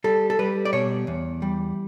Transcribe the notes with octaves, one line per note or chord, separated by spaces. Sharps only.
G3 A4
A4
G3 B4
D5
B2 C#5
E2
G3